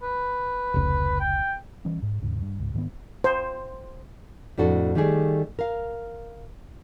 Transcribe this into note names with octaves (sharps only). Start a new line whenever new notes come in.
B4
F1 C#2
G5
E3 G3 C#4
G#2
D#2 G#2 C#3
G2
C#2 G#2
G#2 D#3 A#3 B3
C5
F2 A2 D4 F#4 A4
D#3 G3 A3 G#4 D5
A#4 F5